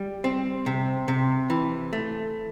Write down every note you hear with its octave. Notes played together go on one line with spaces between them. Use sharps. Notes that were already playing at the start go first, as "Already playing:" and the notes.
Already playing: G3
C4
C3
C3
E3
A3